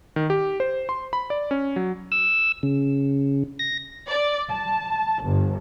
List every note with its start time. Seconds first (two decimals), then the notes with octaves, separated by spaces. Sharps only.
0.16 D#3
0.30 G4
0.60 C5
0.89 C6
1.13 B5
1.30 D5
1.51 C#4
1.76 F#3
2.12 E6
2.63 C#3
3.59 A#6
4.08 D5
4.50 A5
5.23 G1